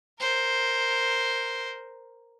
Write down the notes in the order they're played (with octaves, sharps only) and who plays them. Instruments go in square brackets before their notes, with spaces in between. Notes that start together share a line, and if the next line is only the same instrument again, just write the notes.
[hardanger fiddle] A#4 C5